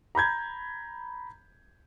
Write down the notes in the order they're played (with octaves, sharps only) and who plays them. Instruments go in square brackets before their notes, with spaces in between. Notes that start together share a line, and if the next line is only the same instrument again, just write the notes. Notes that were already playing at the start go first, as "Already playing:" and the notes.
[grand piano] A#5 B5 G6 G#6